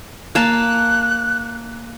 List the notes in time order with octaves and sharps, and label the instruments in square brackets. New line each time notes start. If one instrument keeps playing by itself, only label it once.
[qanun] A#3 F5 A5 [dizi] F#6